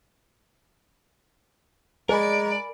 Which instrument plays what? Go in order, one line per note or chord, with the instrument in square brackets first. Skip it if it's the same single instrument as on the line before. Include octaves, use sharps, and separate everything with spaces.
[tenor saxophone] G#3 [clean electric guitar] A#4 G#5 B5 [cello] D5 [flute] A#5